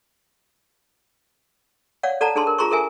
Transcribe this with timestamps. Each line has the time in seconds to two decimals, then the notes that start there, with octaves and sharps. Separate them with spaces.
2.03 C#5 D5 F5 F#5
2.21 A4 D5 F#5 A5 A#5
2.35 D4 G#4 A4 A5 C6
2.47 A#4
2.58 F4 G#4 A#5 C6 C#6
2.71 A4 A#4 E5 G#5